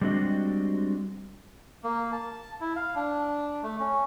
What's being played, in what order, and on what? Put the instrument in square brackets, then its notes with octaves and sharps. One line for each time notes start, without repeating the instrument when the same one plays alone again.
[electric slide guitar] G3 G#3 C4 D4 F#4 D#5
[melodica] A#3
A5
E4
F5
D4
A3
C#4